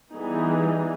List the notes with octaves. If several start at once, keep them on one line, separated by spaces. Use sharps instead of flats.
E3 G3 B3 D#4 G#4